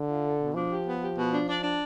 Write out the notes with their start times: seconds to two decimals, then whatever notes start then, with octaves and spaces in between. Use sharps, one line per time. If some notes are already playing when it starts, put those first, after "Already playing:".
Already playing: D3
0.08 F4
0.23 A4
0.39 B2
0.54 F3 D4
0.70 G4
0.86 B3
1.01 G4
1.17 B2
1.32 D4
1.48 D4
1.63 D4